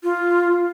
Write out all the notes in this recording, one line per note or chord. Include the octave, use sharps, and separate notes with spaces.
F4